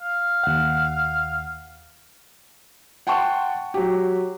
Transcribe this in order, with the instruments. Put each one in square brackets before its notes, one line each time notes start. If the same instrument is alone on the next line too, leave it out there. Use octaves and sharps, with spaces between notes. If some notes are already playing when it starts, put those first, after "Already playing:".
[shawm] F5
[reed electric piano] D#2 F#5
[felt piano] F#5 G5 A5 C6 C#6
F#3 G4